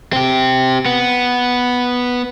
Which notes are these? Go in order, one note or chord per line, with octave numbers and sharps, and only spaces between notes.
C4 G4
B3